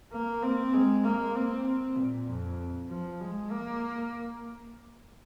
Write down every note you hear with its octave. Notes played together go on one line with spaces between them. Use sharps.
A#3
C4
G#3
A#3
C4
C4
A#2
F2
F3
G#3
A#3